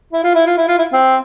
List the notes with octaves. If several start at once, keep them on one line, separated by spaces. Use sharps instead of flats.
E4
F4
E4
F4
E4
F4
E4
C4